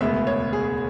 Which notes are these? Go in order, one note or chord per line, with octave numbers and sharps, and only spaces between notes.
E1 D2 C#3 G#3 B3 E5
C#5
G#4